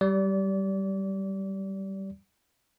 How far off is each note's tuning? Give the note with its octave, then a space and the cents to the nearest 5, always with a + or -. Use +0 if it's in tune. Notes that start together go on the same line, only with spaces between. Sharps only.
G3 -15 D5 -30